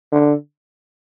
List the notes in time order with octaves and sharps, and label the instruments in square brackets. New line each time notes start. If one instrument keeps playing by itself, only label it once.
[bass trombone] D3